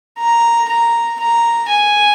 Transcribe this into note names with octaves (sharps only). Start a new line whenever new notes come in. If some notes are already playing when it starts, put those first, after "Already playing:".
A#5
A#5
A#5
G#5